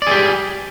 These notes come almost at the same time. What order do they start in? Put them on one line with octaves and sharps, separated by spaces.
D5 G#4 G4